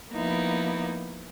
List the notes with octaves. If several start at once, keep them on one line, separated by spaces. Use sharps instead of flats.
F3 A#3 B3 D#4 E4